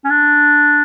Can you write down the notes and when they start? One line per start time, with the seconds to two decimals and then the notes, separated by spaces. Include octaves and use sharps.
0.05 C#4
0.10 D4